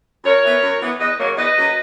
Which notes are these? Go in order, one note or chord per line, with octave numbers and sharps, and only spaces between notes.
F#2 A#4 C#5
E3 B3
F#2
E3 B3
E2 B4 D#5
C#3 F#3 A#3 A#4 C#5
E2 B4 D#5
C#3 F#3 A#3